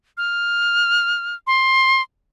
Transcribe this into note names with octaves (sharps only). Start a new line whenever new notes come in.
F6
C6